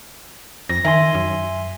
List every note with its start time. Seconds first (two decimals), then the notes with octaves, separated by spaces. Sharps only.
0.69 F2 A#6
0.85 D#3 E5 G#5 C6
1.15 F#2